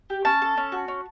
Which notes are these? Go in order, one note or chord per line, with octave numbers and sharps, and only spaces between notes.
G4
C#4 A5
A4
C#4
F#4
C#4